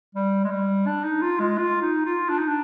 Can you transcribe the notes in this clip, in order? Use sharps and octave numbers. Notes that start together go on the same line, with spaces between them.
G3
G#3
G3
D4
D#4
F4
G#3
F4
D#4
F4
D4
D#4
D4